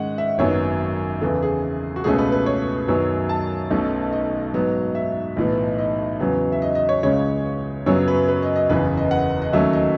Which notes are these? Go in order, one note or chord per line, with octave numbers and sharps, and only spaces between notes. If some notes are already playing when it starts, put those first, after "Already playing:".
Already playing: G#2 D#3 G#3 C#4 F#5
E5
G#1 F#2 D#3 F#3 B3 C#5
E2 C#3 E3 A4
G#4
F#4
C#2 B2 A3 C#4 G#4
B4
B4
C#5
F#2 D#3 F#3 B3
A5
B1 B2 A3 C#4
D#5
G#2 F#3 B3
E5
B1 A2 E3 B3
D#5
E2 C#3 F#3 B3
E5
D#5
D#5
C#5
C#2 C#3 G#3 C#4 C#5
F#2 C#3 F#3 B3 C#5
B4
B4
D#5
D#5
F#1 E2 C#3 B4
D#5
F#5
D#5
D#2 D#3 F#3 A3 C#4 E5
D#5